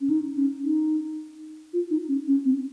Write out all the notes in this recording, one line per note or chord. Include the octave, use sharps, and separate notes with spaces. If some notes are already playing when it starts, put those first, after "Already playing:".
C#4
D#4
C#4
D#4
F4
D#4
C#4
C#4
C4